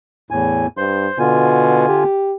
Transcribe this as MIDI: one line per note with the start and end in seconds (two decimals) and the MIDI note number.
0.31 0.67 40
0.31 0.67 45
0.31 0.67 80
0.77 1.08 43
0.77 1.19 72
0.77 1.19 84
1.19 1.84 47
1.19 2.04 50
1.19 2.04 65
1.19 2.04 80
1.89 2.36 67